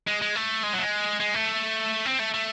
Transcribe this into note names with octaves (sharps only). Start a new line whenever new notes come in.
G#3
G#3
A3
G#3
F#3
A3
G#3
G#3
A3
C4
A3
A3